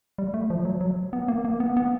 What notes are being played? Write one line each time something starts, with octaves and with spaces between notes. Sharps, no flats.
G3
A3
F3
F#3
F#3
B3
A#3
A#3
B3
B3